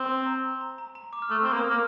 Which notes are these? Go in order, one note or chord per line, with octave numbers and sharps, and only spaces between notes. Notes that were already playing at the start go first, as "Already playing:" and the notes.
Already playing: C4
A#5
A#5
A#5
A#5
D6
F6
A3 D#6
C4
A#3
D#6
F6
A#3